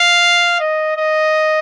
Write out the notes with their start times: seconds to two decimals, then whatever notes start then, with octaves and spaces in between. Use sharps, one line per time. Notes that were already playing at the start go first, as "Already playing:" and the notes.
Already playing: F5
0.60 D#5
0.97 D#5